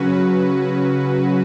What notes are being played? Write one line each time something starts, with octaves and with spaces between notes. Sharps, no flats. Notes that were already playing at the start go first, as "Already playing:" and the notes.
Already playing: C#3 F#3 C#4 F#4 B4